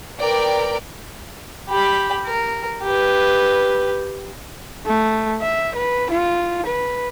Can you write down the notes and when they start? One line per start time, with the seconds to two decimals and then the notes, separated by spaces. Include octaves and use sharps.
0.19 A#4 B4 D5 G5
1.69 G4 B5
2.25 A#4
2.83 G4 B4
4.86 A3
5.41 E5
5.76 B4
6.10 F4
6.66 B4